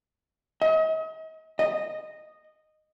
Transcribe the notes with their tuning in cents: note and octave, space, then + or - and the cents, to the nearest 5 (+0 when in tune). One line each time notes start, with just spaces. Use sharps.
D#5 +40
D#5 -10